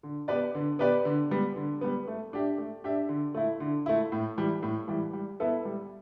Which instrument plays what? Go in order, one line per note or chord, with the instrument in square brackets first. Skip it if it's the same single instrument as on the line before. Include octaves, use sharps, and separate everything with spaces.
[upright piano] D3
B3 G4 B4 D5
D3
B3 G4 B4 D5
D3
G3 B3
D3
G3 B3
A3
D4 G4 E5
A3
D4 G4 E5
D3
A3 E4
D3
A3 E4
A2
E3 G3
A2
E3 G3
G3
B3 E4 A4 E5
G3